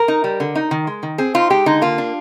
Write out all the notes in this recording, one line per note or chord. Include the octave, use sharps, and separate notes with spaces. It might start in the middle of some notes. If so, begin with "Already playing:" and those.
Already playing: A#4
D#4
G3
D3
D#4
D#3
G#3
D#3
C4 G#4
D#4 F4
G#3 G4
D3 D#4
A#3 F4
D4